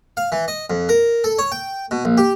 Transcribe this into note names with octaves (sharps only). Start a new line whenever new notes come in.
F5
E3
D#5
F2
A#4
A4
C#5
G5
B2
A#1
G4